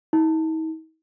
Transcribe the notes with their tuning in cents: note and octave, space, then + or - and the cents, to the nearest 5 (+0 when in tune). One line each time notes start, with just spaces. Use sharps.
D#4 +45